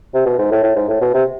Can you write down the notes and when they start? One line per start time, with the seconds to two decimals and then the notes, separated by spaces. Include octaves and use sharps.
0.14 C3
0.26 B2
0.39 G#2
0.51 A2
0.64 A2
0.76 G#2
0.89 A2
1.02 B2
1.14 C3